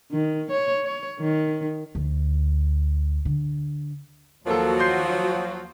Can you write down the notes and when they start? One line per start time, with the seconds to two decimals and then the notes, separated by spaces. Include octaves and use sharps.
0.12 D#3
0.51 C#5
0.84 C#5
1.20 D#3
1.95 D2
3.25 D3
4.47 D#2 F3 F#3 A#3 F#4 A4
4.79 C6 G6 C7